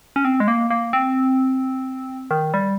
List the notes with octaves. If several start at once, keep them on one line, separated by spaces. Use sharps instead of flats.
C#4
C4
G#3
A#3
A#3
C4
D#3
G3